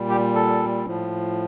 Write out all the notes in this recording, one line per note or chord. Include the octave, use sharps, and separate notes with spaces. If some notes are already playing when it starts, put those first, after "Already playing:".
Already playing: A#2 G3
G4
A4
A2 F3